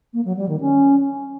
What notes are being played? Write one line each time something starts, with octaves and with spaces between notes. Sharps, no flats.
A#3
F#3
G3
D#3
C#4